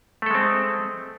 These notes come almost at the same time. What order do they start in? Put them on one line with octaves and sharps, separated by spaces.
A3 A4 G#3 C4